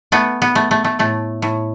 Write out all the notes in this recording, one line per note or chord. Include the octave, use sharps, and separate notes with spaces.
A3 B3
B3
A3
A3
A3
A2 A3
A2